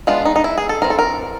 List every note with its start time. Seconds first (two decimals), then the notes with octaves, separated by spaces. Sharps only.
0.07 G#3 B3 D4 F4
0.25 D#4
0.36 D#4
0.44 E4
0.58 G#4
0.69 A4
0.82 E3 G3 C4 A#4
0.90 A4
0.99 A#4